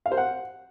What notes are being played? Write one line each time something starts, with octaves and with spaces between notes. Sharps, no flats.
F5
C5
F#5